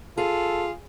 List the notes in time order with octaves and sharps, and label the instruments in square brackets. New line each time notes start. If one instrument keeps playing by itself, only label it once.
[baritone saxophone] F4 [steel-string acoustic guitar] G#4 [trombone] A4